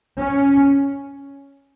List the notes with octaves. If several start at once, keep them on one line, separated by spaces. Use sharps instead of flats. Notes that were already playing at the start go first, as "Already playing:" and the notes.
C#4